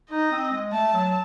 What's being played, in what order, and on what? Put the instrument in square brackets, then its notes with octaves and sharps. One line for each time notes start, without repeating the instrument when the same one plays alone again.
[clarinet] D#4 [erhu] D#5
[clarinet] C4
G#3
[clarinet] A3 [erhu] A5
[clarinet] F#3